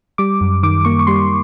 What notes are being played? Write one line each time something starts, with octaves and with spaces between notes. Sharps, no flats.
G3 D6
F#2
D#3 D6
A#3 C#6
C#6
G3 C6